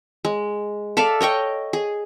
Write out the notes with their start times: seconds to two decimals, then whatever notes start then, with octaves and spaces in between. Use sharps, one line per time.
0.25 G#3
0.97 A4 D5 E5 F5
1.21 C#5 D#5 G5 C#6
1.73 G#4